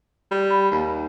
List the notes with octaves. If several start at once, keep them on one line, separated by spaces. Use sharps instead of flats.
G3
B5
D#2